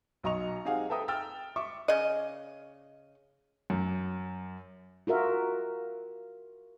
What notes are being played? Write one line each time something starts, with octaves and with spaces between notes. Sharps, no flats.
B1 F#3 D#5 A#5 C#6 F7
C4 D#4 G4 G#4 F5 F#5
A4 B4 E5 G5 A#5 D#6
G5 E6 F6 A6
E5 C#6 D6
C#3 D#5
F#2
F4 F#4 A#4 E5